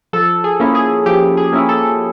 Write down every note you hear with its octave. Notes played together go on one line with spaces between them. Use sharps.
F3 A4
G#4
A#3 C#4 E4
G#4
F3 G4
G#4
A#3 C#4 E4
A4